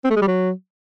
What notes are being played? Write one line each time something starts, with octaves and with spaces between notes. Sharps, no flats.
C4
A3
G#3
G3
F#3